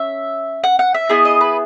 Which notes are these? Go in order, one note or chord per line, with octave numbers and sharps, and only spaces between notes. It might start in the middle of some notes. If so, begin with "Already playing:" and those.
Already playing: C#4 E5
F#5
F#5
E5
B3 E4 G#4 D#5
D#5
B4